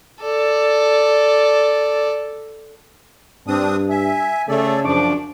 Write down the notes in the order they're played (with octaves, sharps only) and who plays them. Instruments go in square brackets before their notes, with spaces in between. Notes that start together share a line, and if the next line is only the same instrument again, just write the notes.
[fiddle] A4 D5
[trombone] G2 [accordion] C4 D4 D#6
[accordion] E5 [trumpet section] G#5
[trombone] C#3 [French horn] A3 [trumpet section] G#4 C#5 A5 [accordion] A4 D5
[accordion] F#2 F3 [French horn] D4 [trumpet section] C#6 D6